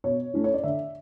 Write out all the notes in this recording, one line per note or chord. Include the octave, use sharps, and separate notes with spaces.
B2 C#5
A3 C#4 E4
C#5
D5
D3 E5